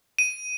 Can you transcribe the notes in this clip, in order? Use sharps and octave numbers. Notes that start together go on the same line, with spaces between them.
D#7